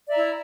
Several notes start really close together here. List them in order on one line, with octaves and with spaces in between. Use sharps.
D5 E5 A#5 E4